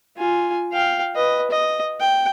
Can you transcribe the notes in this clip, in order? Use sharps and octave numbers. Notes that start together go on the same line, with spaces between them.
F4 G#5
F5 G5
B4 D#5
D#5
G5